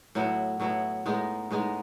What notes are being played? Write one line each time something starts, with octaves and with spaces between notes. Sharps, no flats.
A2 F#3 B3 E4
A2 F#3 B3 E4
A2 G#3 B3 D#4
A2 G#3 B3 D#4